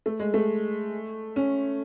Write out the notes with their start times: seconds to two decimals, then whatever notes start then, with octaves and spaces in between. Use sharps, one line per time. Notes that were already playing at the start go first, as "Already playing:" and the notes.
0.06 A3
0.20 G#3
0.34 A3
1.36 C#4